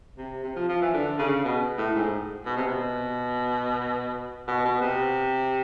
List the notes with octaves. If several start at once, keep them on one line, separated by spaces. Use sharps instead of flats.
C3
C3
F3
F3
E3
D3
C#3
B2
A2
G#2
B2
C3
B2
B2
B2
C3